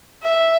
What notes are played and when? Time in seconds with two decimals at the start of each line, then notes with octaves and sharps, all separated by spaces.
0.22 E5